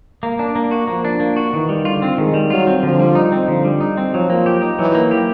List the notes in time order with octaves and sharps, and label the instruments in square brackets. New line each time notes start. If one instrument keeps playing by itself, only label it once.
[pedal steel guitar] A#3
D4
A#3
F#4
[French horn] F3 [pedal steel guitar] A#3
[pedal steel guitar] D4
A#3
F#4
[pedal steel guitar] D#3 [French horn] E3
[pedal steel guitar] G3
[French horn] D3 [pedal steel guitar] F4
[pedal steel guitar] C4
[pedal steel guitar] D#3 [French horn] G#3
[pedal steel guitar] G3
[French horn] F#3 [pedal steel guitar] F4
[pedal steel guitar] C4
[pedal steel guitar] D3 [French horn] F3
[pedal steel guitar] G3
D#4
C4
[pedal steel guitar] D3 [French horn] F3
[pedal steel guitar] G3
D#4
C4
[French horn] F3 [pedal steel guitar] F#3
[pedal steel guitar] A#3
G4
D#4
[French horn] E3 [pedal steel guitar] F#3
[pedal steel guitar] A#3
G4